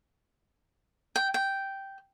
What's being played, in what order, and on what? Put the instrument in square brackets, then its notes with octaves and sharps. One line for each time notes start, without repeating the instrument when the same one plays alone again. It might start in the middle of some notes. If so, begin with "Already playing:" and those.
[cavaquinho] G5
G5